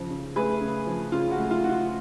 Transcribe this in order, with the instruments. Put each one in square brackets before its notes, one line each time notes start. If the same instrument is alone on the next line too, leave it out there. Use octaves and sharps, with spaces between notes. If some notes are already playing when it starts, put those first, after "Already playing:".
Already playing: [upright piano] C#3 F3
C#3
A3 G#4 B4
C#3
F3
C#3 F4
F#4
A3
F4
C#3 F#4
F4